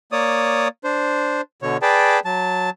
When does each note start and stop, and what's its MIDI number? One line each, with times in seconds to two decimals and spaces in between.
0.12 0.68 58
0.12 0.68 73
0.12 0.68 74
0.12 0.68 87
0.84 1.41 62
0.84 1.41 72
1.62 1.77 47
1.62 1.77 50
1.62 1.77 73
1.82 2.20 68
1.82 2.20 71
1.82 2.20 74
1.82 2.20 79
1.82 2.20 81
2.25 2.70 54
2.25 2.70 81